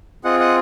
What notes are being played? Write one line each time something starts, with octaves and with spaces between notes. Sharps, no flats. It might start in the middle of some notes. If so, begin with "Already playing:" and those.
C4 F4 G#4 D#5 F#5
D#5 F#5